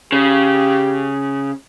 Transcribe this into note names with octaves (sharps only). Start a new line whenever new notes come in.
C#3 G4